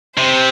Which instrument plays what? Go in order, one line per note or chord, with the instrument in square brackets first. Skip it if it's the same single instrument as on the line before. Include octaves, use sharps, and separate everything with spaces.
[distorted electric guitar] C3 [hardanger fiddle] C5